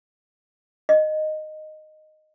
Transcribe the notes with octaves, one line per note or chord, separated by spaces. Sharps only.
D#5